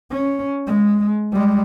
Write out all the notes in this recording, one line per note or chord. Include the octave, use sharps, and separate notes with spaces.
C#4
G#3
G3 G#3